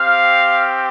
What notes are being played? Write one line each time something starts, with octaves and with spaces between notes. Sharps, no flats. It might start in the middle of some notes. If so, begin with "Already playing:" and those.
Already playing: C4 G4 F5